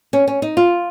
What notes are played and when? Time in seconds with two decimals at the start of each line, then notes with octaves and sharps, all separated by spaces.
0.13 C#4
0.28 C#4
0.42 D#4
0.57 F4